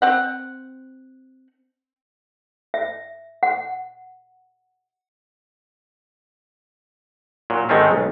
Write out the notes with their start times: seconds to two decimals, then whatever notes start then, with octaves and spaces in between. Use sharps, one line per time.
0.02 C4 F#5
2.74 E5
3.43 F#5
7.50 A#2 F#3
7.69 G#2 D#3 G#3 A3 C4 C#4
7.91 B1